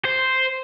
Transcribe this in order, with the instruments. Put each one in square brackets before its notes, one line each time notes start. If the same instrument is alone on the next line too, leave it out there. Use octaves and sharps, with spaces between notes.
[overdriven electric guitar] C5